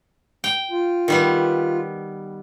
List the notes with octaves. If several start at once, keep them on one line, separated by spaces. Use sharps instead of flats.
G5
F4
D#3 G3 B3